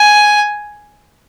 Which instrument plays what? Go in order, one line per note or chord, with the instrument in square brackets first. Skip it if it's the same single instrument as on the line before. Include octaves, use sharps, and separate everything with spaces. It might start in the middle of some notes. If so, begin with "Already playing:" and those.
Already playing: [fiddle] G#5